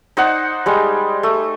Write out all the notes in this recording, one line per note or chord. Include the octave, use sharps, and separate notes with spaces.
D#4 C5 D5 F#5
G3 G#3
A3